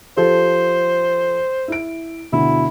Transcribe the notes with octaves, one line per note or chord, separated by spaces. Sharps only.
F3 G4 A4 C5
E4 D7
D2 B2 E4